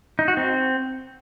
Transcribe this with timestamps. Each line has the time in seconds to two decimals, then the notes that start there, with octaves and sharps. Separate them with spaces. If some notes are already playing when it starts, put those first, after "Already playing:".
0.19 D#4
0.28 F#4
0.37 C4